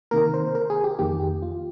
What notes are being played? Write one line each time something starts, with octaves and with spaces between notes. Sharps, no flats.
C3 D#3 A#3 A#4
C5
A#4
G#4
G4
F2 D#3 A#3 G4
F4